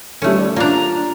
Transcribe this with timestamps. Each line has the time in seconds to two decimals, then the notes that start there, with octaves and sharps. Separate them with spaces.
0.22 D3 G3 A3 C#4
0.38 D5
0.56 A#3 D4 F4 A#5